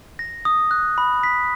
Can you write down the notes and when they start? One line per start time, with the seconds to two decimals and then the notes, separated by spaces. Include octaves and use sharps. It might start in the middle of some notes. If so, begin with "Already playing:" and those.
0.19 A#6
0.45 D#6
0.71 F#6
0.98 B5
1.23 B6